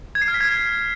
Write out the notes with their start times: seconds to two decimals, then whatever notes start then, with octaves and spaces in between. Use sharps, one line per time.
0.15 G#6
0.22 C7
0.28 F6
0.34 B6
0.41 G#6